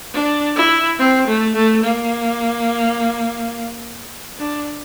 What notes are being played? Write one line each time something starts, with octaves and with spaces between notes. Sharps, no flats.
D4
E4
C4
A3
A3
A#3
D4